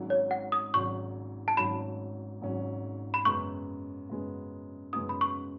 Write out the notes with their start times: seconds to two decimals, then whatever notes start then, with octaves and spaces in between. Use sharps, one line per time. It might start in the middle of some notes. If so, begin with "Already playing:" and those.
Already playing: G#1 G#2 F#3 C#4
0.10 C#5
0.31 F#5
0.52 D#6
0.74 G#1 G#2 F#3 C#4 C#6
1.48 A5
1.57 G#1 G#2 F#3 C#4 B5
2.41 G#1 G#2 F#3 C#4
3.14 B5
3.25 F#2 C#3 G#3 B3 C#6
4.09 F#2 C#3 G#3 B3
4.93 F#2 C#3 G#3 B3 D#6
5.09 B5
5.21 C#6